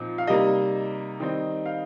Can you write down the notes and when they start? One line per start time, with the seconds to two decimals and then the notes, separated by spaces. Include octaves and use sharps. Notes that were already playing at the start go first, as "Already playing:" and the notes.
Already playing: A#2 F3 C4 D#4
0.18 F5
0.27 C3 G3 A#3 D#4 D#5
1.20 D#3 G3 C4 D#4
1.66 F5